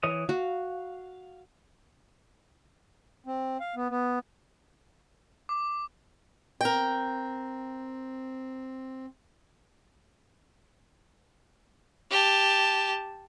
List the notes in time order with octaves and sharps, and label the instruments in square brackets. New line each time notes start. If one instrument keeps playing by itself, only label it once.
[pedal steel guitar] E3 C#5 D#6
[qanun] F#4 [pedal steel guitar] F5
[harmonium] C4
F5
B3
B3
[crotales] D6
[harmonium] C4 [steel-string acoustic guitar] A#4 G5
[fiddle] G4 A5